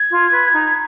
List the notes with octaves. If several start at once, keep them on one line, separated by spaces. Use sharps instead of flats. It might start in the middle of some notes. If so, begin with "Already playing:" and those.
Already playing: G#6
F4
B4
D#4